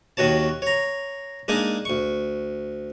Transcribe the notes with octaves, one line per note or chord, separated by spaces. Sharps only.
D#2 D#3 F#4 C#5 A5
C#5 A#5
G#3 A#3 D4 D#4 G#5
D2 C#6